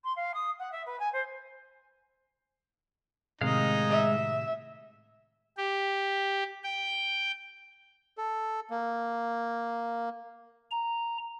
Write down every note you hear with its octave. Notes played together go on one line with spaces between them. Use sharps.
C6
F5
D#6
F#5
E5
B4
G#5
C5
A2 C3 D#3 G#3 D#4 F5
E5
G4
G5
A4
A#3
A#5